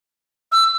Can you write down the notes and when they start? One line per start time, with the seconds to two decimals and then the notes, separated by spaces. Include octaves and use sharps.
0.52 E6